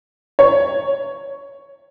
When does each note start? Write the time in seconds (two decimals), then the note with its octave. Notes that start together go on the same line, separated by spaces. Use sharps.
0.39 C#5